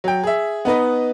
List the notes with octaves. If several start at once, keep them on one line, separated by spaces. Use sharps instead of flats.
F#3 G5
G#4 E5
B3 D#4 B4 D#5